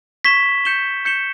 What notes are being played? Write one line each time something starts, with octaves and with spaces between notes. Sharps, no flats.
C#6 G#6 B6 E7 G7
G6 C#7 E7 G7
G6 C#7 E7 G7